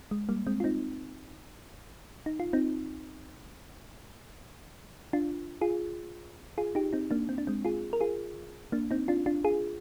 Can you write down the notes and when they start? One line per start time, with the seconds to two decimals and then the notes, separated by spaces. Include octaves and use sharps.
0.11 G#3
0.29 G3 A#3
0.47 G#3 C4
0.60 F4
0.64 C4 D#4
2.26 D#4
2.40 F4
2.53 C4 D#4
5.13 D4 F4
5.61 F4 G#4
6.58 F4 G#4
6.75 D#4 G4
6.93 C4 D#4
7.11 A#3 D4
7.29 C4
7.38 D4
7.47 G#3 C4
7.65 F4 G#4
7.93 A#4
8.01 F4 G#4
8.72 A#3 D4
8.91 C4 D#4
9.08 D4 F4
9.26 D4 F4
9.45 F4 G#4